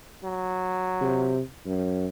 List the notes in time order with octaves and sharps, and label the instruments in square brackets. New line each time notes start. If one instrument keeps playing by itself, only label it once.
[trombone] F#3
[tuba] C3
F#2